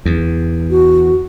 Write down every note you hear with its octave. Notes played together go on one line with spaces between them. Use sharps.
E2
F#4